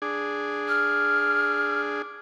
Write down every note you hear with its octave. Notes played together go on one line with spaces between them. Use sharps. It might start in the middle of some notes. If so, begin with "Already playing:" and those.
D4 G#4
F6